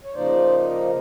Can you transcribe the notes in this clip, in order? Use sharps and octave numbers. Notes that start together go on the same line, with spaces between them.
C#5
C#3 F3 A#3 D#4 C5 D5